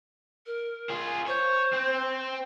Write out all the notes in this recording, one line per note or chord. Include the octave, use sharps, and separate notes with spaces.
A#4
F4 G#4
C5 C#5
C4